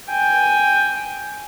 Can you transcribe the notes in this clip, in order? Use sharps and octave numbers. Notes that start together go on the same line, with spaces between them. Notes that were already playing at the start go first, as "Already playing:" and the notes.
G5 G#5